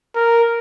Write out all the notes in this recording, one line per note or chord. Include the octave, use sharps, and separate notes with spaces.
A#4